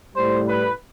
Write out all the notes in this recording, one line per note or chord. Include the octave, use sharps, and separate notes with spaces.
A2 G3 C5
B4